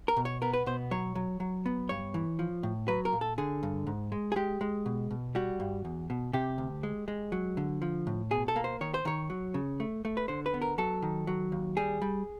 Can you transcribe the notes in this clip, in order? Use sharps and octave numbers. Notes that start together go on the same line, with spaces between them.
A#4
B2
C#5
B3 A#4
B4
B2 C5
F#3 C#5
F#3
F#3
B3
G2 C#5
E3
F3
A2
F#3 B4
A#4
A#2
A4
D3 G#4
G2
G#2
G#3
G#4
G#3 G4
G#3
B2
B2
G3 F#4
G2
E2
B2
C3 G4
D2
G#3
G#3
F#3
D3
F3
A2
B2 G#4
A4
A#3
C5
D#3 C#5
C5
D#3 C#5
F#3
C#3
A3
A3
B4
D3 C5
B4
B3
A#4
F#3 A4
D#3
F#3
D#2
G3 G#4
G3